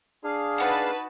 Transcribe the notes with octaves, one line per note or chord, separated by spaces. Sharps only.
D4 G#4 F5
D#4 F#4 B4 A5